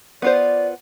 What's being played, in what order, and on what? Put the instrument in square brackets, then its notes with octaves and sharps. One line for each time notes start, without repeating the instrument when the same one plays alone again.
[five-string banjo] B3 F4 C5 [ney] D5